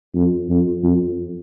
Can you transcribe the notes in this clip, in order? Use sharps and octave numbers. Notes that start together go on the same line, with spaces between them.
F2
F2
F2